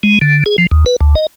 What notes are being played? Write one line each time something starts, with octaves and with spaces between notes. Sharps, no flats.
G#3
D3
G#4
F3
D#2
B4
D2
D#5